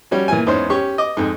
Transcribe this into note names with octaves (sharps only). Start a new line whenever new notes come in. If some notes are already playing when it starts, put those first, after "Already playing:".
G3 C#4 F#4
A#2 E3 G#5
E2 G#2 C#4 C5
C#4 G4 C#6
D#5 D6
F2 G#2